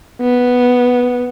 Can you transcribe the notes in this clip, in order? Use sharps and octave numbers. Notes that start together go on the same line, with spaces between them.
B3